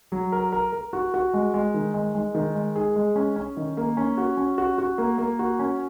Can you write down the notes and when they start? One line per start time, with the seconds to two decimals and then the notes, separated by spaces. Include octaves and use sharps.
0.12 F#3
0.32 A#4
0.53 A#4
0.73 A#4
0.93 F#4
1.14 F#4
1.34 G#3
1.54 G#3
1.74 D#3
1.94 G#3
2.14 G#3
2.35 D#3
2.55 G#3
2.76 G#4
2.96 G#3
3.16 C#4
3.36 C#4
3.57 D#3
3.77 A#3
3.97 C#4
4.18 F#4
4.37 C#4
4.58 F#4
4.78 F#4
4.98 A#3
5.18 A#3
5.39 F#4
5.59 C#4